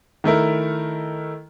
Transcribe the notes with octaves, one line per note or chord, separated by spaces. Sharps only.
D#3 A3 E4 A#4